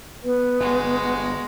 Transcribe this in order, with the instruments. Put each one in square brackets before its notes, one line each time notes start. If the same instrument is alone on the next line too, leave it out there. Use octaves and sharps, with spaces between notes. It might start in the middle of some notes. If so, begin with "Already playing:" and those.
[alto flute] B3 [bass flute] B4
[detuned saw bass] G1 [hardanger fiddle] G#3 F#4